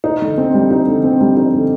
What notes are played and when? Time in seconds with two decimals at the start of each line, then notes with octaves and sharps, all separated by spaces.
0.04 D#4
0.22 D3
0.38 C4
0.54 G3
0.71 D#4
0.88 D3
1.04 C4
1.21 G3
1.37 D#4
1.54 D3